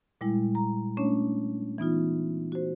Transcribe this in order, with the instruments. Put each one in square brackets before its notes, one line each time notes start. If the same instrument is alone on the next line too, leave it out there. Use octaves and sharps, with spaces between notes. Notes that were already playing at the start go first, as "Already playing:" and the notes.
[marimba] A#2 G3 G#3 E4
A#5
A3 C#4 D4 C#5
E3 B3 D#4 F4
F#4 C5